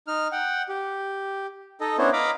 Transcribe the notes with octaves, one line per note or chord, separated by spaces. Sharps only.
D#4 F6
F#5 G5
G4
D#4 A4 D#5
B3 C#4 D4 E4 C5 C#5
D#5 F5 A#5 B5 D6